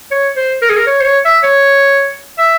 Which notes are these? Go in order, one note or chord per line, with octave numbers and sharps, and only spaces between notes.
C#5
C5
A#4
G#4
A#4
C#5
C5
C#5
E5
C#5
E5